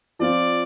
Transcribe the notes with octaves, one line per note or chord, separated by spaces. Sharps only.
F3 C4 F4 D5